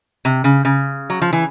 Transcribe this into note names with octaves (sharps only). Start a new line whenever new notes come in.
C3
C#3
C#3
F#3
F3
E3